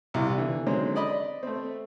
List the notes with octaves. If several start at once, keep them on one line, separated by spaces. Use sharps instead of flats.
C2 C3 E4 F4
D3 E3
D3 D#3 F#3 G#3 C4 C#4
D5 D#5 B5
A3 C4